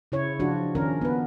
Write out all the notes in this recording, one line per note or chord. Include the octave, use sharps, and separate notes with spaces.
C#3 E4 C#5
F3 D4 F4 F#4
D#3 C#4 D4 A#4
B3 B4